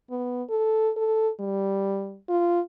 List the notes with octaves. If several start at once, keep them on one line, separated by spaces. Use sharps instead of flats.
B3
A4
A4
G3
F4